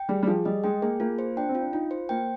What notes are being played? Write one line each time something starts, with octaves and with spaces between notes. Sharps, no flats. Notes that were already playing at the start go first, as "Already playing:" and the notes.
Already playing: G5
G3 G#4
G3
F3 G#4
G3 D#5
G#3 G5
A#3 G#4
A#3 F4
C5
D4 G5
C4
F4
D4
D#4 F4
C5
A#3 G5